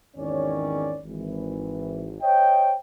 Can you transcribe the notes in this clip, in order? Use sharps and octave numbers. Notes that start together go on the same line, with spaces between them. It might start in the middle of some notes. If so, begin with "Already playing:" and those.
G#1 E2 D#3 C#4 C#5 D5
G#1 E3
C5 C#5 D#5 G5